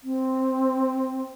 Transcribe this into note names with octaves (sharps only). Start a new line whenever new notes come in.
C4